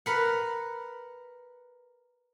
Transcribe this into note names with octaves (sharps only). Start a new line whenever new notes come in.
A#4 B4 F#5